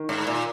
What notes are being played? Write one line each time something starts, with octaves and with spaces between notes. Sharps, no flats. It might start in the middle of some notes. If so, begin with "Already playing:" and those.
Already playing: D#3
G#2
A#2